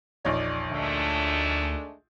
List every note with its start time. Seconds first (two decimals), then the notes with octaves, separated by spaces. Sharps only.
0.25 E1 A#1 D#4 C#5 D5
0.71 D2 D#3 G#3 A3 D4